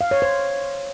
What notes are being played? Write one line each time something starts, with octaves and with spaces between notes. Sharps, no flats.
F5
C#5
C5